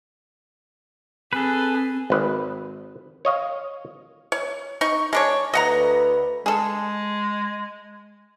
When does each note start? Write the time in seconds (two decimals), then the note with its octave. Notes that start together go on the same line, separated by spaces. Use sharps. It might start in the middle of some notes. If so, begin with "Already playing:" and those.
1.33 C4 G#4 A4 B4
2.10 G#1 B4
3.25 C#5 D#5 F5
4.32 C#5
4.81 D#4 C#6
5.13 G#3 D4 C#5
5.53 D2 B4 D#5 F#5 A#5
6.46 G#3 G#4 A4